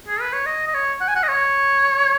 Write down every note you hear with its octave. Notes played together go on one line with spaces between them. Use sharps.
G#4
B4
C#5
D#5
D#5
C#5
F#5
G#5
F#5
D#5
C#5